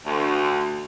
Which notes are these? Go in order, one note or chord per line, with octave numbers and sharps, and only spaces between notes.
D2